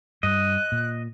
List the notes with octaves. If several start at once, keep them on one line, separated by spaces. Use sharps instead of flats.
G2 D#5 F#6
A#2